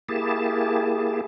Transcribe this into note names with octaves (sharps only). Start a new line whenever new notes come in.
A#3 E4 G4 G#4 A5